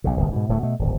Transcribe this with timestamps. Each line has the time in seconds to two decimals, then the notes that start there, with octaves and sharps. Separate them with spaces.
0.04 B1 C#3
0.17 D1 G1 C2 D#3
0.33 G#2 B2
0.49 D1 A2 F#3 A3
0.62 B2 A3
0.79 D1 G#1